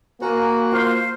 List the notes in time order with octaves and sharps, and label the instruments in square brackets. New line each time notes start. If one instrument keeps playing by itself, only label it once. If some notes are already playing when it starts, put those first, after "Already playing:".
[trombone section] A#3 [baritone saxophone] F#4 [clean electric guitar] A#4 [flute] G#5
[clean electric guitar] F4 C6 [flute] C5